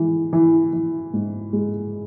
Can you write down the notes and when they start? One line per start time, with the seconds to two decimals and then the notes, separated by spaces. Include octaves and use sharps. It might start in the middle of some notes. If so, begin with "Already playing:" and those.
Already playing: E3 G#3
0.33 E3
0.73 E3
1.14 G#2
1.53 G#3